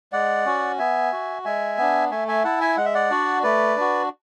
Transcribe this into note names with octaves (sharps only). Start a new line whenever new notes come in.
G#3 D5 F#5
C#4 F#4
B3 E5 G#5
F#4
G#3 E5 G#5
B3 D4
A3 E5 G#5
E5 G#5
E4 F#5 A5
E5 G#5
G#3 F#5
E5
D5 F#5
D4 F#4
A3 B4 D5
D4 F#4